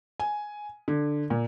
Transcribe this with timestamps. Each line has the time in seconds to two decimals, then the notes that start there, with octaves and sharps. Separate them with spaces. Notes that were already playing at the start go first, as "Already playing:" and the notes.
0.20 G#5
0.88 D3
1.30 A#2